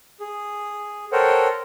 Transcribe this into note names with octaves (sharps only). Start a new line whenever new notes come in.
G#4
A4 A#4 C5 C#5 F#5 G5